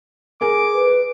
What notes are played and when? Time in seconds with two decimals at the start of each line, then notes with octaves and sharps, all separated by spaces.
0.41 G#4 A#4 G#5 D6
0.74 B4